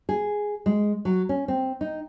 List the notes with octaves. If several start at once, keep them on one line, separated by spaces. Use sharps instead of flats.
G#4
G#3
F#3
C#4
C4
D#4